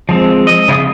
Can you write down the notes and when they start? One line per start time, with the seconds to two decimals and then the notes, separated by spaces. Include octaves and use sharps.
0.09 F3 G#3 C4
0.47 D#5
0.68 C#3 E4 F4 E5 D#6